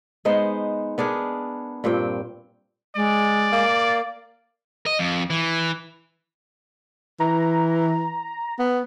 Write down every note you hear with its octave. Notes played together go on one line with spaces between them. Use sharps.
G#3 B3 D#4 C5
B3 D4 G#4 A#4
G2 A#2 C4 G5
G#3 D5
A#3
D#5
F2
E3
E3 A#5
B3